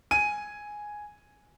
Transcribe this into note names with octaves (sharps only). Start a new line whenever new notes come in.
G#5 D#7